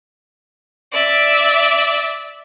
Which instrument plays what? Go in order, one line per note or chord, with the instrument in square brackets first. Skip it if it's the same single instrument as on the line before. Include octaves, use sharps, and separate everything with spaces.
[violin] D5 E5